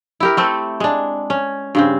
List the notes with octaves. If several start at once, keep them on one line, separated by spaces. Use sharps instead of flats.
E4 G4 A#4
A3 C4 A4
G#3 D4
C#4
G2 C#3 C4